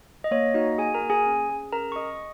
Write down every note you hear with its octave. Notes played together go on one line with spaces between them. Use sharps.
D#5
A#3 C#5
D#4 F#4 D#5
F#4 G#4 G#5
A#4 A#5
A#3
G#4 G#5
C#4
G#4
C#4 A#4 A#5
C#6
G#4 D#5 D#6